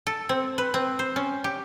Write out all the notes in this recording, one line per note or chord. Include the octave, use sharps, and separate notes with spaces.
A4
C4
B4
C4
C5
C#4
G4